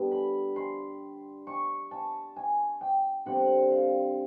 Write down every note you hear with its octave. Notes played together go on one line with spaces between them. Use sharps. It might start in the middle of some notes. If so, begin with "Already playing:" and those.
Already playing: D3 G3 B3
B5
C6
C#6
A5
G#5
G5
D3 G3 C4 F#5
F5